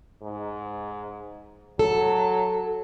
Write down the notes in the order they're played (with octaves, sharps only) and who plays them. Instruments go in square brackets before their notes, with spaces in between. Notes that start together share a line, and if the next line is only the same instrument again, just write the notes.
[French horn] G#2
[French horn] F#3 [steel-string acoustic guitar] A4